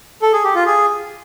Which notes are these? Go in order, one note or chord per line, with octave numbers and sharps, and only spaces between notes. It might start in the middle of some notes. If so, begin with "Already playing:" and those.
A4
G#4
G4
F4
G#4